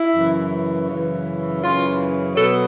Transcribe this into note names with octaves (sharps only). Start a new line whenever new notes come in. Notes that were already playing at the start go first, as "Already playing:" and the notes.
Already playing: E4
F#2 C#3 E3
F#2 C#3 E3
F#2 C#3 E3 F4
B2 F#3 B3 A4